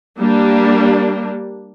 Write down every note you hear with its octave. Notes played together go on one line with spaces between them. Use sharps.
G3 A#3 D4